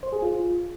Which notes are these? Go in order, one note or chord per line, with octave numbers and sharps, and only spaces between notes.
C5
G#4
F4